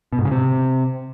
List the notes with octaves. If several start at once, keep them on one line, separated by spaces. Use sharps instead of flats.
B2
G#2
C#3
C3